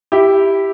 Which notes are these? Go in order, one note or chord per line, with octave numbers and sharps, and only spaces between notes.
E4 G4